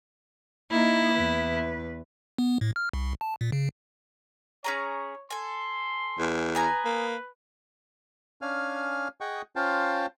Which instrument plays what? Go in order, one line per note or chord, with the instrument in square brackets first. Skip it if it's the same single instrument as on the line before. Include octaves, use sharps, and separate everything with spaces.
[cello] A#3 D#4 [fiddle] E4
[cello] E2 B4
[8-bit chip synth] B3
A2
F6
C2
A5
A#2
C#3
[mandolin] C#4 G#4 A#5 [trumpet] C#5
[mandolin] A4 G#5 [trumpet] C6
[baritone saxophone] E2
[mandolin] B3 G#5 A#5 [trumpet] B4
[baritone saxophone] A#3
[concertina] C#4 D4 F5 G#5 F6
G#4 D#5 F#5 G5 C#6
C#4 F4 C5 F5 G5 A5